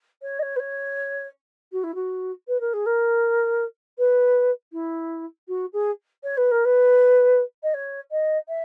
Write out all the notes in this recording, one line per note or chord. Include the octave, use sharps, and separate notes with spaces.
C#5
D#5
C#5
B4
C#5
F#4
E4
F#4
B4
A#4
G#4
A#4
B4
E4
F#4
G#4
C#5
B4
A#4
B4
D#5
C#5
D#5
E5